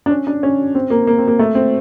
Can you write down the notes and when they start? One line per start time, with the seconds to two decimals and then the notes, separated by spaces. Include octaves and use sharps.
0.06 D4
0.10 C#4
0.27 D4
0.43 C#4
0.75 C4
0.90 A#3
1.07 A#3
1.18 C4
1.28 A#3
1.39 A3
1.55 C4